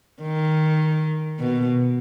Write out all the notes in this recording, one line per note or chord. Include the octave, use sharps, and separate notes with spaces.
D#3
B2